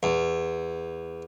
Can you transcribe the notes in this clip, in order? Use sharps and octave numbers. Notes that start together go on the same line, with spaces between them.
E2